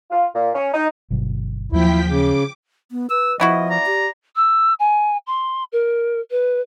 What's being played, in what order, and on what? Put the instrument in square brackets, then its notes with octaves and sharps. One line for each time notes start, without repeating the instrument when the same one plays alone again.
[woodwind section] F4
A#2
C#4
D#4
[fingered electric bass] G1 B2 F#3
[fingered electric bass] D#2 F#3 A#3 [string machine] F3 G5 B6 [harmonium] E4
[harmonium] C#3 [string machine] D6
[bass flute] B3
[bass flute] B4 [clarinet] E6
[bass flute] F3 [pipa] B3 E4 F#4 [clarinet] D#5
[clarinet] D5 [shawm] A#5
[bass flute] G4
[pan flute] E6
G#5
C6
A#4
B4